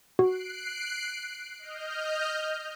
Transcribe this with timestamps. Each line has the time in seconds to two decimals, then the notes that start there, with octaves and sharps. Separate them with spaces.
0.19 F#4 F#6 C7 D7
1.59 D#5 F6 G6